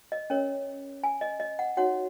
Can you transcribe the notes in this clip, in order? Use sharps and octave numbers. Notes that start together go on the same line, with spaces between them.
D#5
C#4 A#4 C#5
G#5
D#5
D#5
F#5
D#4 F#4 C#5 F#5